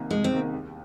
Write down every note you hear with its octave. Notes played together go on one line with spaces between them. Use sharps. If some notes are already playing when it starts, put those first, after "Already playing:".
Already playing: C2 C3 D#3 A#3
C2 G#3
C4
C3 D#3 A#3
D#2